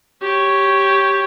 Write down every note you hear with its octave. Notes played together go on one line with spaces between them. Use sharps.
G4 C#5